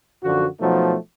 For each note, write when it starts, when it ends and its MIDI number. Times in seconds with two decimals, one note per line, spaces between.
0.23 0.47 42
0.23 0.47 50
0.23 0.47 53
0.23 0.47 66
0.61 0.96 47
0.61 0.96 53
0.61 0.96 54
0.61 0.96 57
0.61 0.96 63